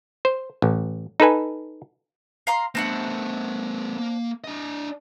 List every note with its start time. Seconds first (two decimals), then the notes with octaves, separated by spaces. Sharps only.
0.25 C5
0.62 A1
1.20 D#4 A4 B4 G#5
2.47 F5 A#5 C6
2.75 A3 B3 C4 D4 F#5
3.98 A#3
4.44 D4 D#5